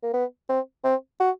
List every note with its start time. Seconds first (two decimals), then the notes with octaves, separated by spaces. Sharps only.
0.03 A#3
0.14 B3
0.49 C4
0.84 C4
1.20 F#4